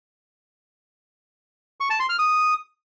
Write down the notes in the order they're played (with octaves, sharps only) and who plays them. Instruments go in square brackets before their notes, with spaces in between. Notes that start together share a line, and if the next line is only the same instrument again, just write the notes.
[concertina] C#6
A5
C6
F6
D#6